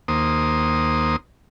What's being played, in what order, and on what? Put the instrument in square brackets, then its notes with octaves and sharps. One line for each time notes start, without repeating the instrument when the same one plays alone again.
[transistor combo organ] D#2 A#3 C5 D#6